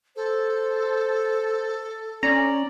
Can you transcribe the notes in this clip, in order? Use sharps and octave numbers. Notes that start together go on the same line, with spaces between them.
A4 C5
C#4 D5 A#5